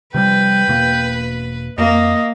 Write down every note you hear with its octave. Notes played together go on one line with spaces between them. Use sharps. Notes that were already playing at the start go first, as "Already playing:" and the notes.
C3 F3 G3 B4 G5
E1 B2 A#3
F2 A#3 D#5